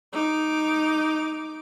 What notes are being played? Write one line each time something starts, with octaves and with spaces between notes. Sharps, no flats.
D#4 D6